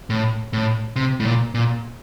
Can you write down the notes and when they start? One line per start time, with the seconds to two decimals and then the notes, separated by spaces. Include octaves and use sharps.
0.10 A2
0.53 A2
0.96 C3
1.20 A2
1.25 A#2
1.54 A#2